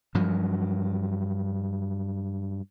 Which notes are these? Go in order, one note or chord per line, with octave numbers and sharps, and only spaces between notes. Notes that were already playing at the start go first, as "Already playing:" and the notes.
G2 F3 F#3